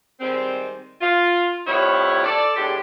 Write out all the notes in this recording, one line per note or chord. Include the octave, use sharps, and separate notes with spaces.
D#3 G3 G#3 C4
F4
F2 A2 G3 B3 E4 C#5
A4 D5
E2 A2 G#3 D4 G4